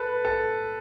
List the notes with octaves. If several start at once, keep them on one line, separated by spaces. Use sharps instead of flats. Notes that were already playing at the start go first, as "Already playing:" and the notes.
Already playing: A4 B4
A4